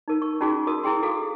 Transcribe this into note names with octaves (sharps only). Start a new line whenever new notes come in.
D#4 A#4
C#6
C#4 D#4 F4 F#4 G#4
F#4 A#4 D#6
E4 G#4 G5 C6
F#4 A4 F5